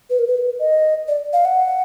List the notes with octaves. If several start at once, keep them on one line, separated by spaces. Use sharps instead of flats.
B4
A#4
B4
D#5
D5
F5
F#5